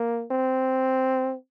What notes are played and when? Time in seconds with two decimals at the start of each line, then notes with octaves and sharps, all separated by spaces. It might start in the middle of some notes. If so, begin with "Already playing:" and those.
Already playing: A#3
0.31 C4